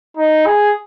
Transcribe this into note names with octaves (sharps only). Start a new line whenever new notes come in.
D#4
G#4